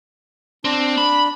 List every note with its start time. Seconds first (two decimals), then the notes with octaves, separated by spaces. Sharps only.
0.65 C4 D4
0.98 B5